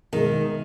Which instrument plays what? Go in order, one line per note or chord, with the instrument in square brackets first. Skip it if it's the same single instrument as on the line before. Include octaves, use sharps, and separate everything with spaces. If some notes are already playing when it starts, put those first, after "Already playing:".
[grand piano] B2 G#3 B3 D#4 G#4 [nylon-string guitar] D#3